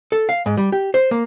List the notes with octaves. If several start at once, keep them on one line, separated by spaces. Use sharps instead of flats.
A4
F5
G#2
G3
G4
C5
A#3